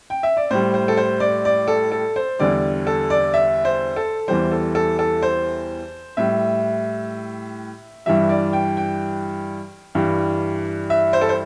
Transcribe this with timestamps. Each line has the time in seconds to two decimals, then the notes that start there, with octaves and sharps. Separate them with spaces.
0.10 G5
0.23 E5
0.37 D5
0.51 A2 G3 C5
0.74 C5
0.88 A4
0.97 C5
1.20 D5
1.45 D5
1.68 A4
1.92 A4
2.16 C5
2.39 E2 D3 G3 D5
2.87 A4
3.10 D5
3.34 E5
3.65 C5
3.96 A4
4.28 E2 E3 G3 C5
4.51 A4
4.75 A4
4.99 A4
5.22 C5
6.17 A2 G3 E5
8.06 G2 E3 G3 E5
8.29 D5
8.53 G5
8.77 G5
9.95 G2 E3 G3
10.90 E5
11.13 C5
11.21 A4
11.29 C5